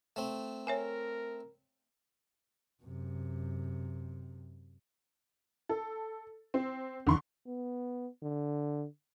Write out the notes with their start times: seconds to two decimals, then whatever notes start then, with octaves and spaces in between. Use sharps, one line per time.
0.16 A3 C4
0.67 A#4 C#5 E5 G#5
2.83 F#2 C3
5.69 A4
6.54 C4
7.07 E2 D3 D#3 C6 C#6
7.47 B3
8.22 D3